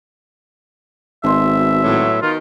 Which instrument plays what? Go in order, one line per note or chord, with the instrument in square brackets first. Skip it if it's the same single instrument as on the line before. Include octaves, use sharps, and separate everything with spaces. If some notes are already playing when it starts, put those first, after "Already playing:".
[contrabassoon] G#1 [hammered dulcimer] B2 C6 [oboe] E5
[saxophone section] A2 F#3
[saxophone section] D#3 [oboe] F4